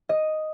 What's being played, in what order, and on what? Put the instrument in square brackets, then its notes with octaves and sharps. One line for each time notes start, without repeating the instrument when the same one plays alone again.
[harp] D#5